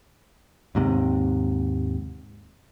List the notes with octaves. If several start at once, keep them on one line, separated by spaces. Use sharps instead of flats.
D#2 G#2 C3